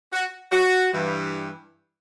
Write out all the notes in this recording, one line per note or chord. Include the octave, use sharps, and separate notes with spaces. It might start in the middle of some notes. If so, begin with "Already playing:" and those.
F#4
F#4
G2 E3 G3